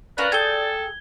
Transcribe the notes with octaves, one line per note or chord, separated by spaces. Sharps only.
C#4 F4 A#4 B4 D5 F#6
G#4 A4 G5 G6 G#6 G7